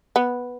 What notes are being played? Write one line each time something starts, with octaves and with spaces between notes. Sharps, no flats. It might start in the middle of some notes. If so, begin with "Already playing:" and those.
B3